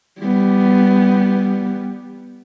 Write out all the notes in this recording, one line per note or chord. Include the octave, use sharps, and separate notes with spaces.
G3 B3